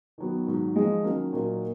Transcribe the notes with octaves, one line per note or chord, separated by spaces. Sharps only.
D#3 F#3 B3
G#2 D#3 F#3
F3 G#3 D#4 G#4
D#3 F#3 A#3 C#4
A#2 F#3 A#3 D#4 A#4